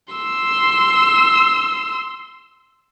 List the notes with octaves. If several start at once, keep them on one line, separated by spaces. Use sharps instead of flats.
C6 E6